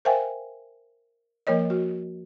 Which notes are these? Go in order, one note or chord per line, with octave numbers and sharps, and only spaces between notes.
A#4 C5 E5 F5 G5 G#5
F3 A#3 A#4 C#5 D#5
F#4